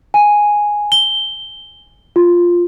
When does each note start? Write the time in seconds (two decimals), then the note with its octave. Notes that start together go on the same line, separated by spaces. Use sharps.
0.14 G#5
0.92 G7
2.16 F4